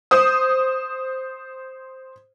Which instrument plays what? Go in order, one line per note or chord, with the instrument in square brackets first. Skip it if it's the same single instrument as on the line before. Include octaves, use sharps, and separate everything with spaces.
[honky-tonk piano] C5 D#6